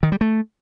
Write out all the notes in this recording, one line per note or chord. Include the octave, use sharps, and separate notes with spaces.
D#3
G3
A3